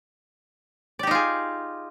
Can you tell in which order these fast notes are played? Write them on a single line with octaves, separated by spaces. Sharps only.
D5 G4 D#4 F4 G#4